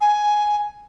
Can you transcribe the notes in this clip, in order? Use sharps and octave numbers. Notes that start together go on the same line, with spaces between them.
G#5